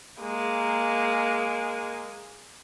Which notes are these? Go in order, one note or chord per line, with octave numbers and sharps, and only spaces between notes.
G#3 A#3